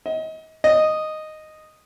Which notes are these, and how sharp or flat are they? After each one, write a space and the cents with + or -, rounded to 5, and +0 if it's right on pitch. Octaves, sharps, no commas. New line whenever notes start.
D#5 +30
D#5 -5